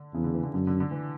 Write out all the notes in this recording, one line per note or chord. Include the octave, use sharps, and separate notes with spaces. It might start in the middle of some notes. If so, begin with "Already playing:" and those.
Already playing: D3
E2 C#3
D3
E3
D3
F#2 D3
D3
D3
E3